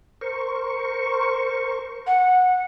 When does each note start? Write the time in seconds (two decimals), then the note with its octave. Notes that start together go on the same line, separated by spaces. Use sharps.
0.21 A#4 C5 C#6
2.07 F#5